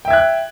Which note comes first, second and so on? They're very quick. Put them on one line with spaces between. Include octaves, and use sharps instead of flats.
G5 E5 G#6 F#6